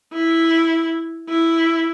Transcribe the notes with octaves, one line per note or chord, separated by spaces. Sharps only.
E4
E4